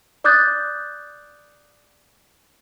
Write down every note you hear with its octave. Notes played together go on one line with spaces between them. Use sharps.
D5 D6 D#6 F#6 G6 A6